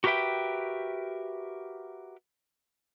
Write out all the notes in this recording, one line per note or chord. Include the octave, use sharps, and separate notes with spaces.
F#4 G4 A#4 B4 E5 G5